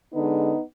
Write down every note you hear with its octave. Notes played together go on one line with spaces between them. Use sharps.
D3 G#3 B3 D#4